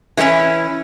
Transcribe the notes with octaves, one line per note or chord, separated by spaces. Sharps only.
E3 G#3 B3 C#4 E4